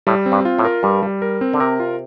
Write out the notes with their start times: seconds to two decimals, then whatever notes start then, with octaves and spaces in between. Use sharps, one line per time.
0.07 A2 G3
0.26 C4
0.32 G2
0.45 F4
0.59 A2
0.64 A#4
0.83 G2 G3
1.02 G3
1.22 A#4
1.41 C4
1.53 D3
1.60 C3 A#4
1.80 F4